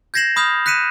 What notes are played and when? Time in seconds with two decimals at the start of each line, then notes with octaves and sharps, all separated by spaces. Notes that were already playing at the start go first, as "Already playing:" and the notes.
0.14 G6 G#6 A#6 C7 E7 F#7
0.36 B5 D#6 F6 G6 F7
0.66 F#6 B6 C#7 D#7 E7